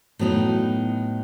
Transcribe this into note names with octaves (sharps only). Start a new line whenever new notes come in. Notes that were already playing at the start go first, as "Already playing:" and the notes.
A2 F#3 B3 D#4